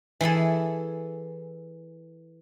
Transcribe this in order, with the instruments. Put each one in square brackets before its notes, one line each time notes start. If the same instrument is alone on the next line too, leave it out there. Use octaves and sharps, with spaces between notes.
[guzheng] E3 E4 G#4 A4